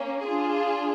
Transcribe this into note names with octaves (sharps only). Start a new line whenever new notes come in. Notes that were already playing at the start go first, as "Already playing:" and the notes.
Already playing: A#3 C#4
D4 F4 G#4